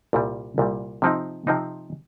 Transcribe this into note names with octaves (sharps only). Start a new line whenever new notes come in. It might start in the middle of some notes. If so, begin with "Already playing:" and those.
C2 A#2 G3
C2 A#2 G3
C3 F3 C4 D#4
C3 F3 C4 D#4